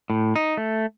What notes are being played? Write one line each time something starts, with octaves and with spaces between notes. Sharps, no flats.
A2
D#4
A3